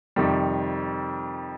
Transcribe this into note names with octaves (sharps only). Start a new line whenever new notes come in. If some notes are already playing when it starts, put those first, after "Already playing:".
F2 C3 D#3 G3